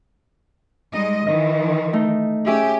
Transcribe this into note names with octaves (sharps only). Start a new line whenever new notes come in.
G3 G#3 D#4 D#5
D#3 E3 D#5
A3 D#4
C#4 G4 G#4 E5